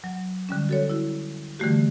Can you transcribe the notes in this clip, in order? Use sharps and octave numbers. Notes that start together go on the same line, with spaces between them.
F#3
D3 G3 C#4
F#4 A4 C#5
E4 F#4
D3 E3 G3 A3 F#4 G4